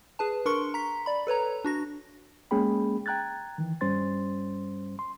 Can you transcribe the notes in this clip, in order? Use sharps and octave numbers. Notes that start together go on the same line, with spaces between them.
G#4 B4 A5
D4 A#4 C6 C#6 C#7 G7
A#5 B6
D5 B5
A4 B4 C#5 A#5
D4 F#4 A#6
G#3 A#3 C#4 G#4 G5 B5
G5 A#5 F#6 G#6 A6
D#3 E3
G2 G3 C#4 C5 C6 A6
C6